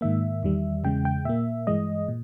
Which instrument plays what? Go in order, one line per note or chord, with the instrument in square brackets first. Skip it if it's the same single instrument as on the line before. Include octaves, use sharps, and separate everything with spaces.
[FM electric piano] G#2 D#3 A#3 E5
E2 D#3 G3
E2 C#3 G#3 G5
G5
A#2 A#3 E5
G2 E3 G#3 D#5
A#2